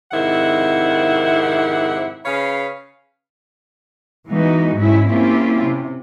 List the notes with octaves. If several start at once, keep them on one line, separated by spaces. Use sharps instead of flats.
F2 G#2 C3 D#3 E4 F#5
C#3 B4 C#5 F5
E3 G#3 B3 D#4 F#4
G#2 G#3 C#4 E4
A#3 C4 C#4 E4 F4 G4
C3